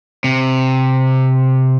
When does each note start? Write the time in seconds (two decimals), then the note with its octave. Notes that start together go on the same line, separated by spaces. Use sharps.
0.24 C3